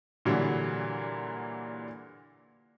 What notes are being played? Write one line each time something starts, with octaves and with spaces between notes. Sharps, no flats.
A#2 D3 E3 F#3 G3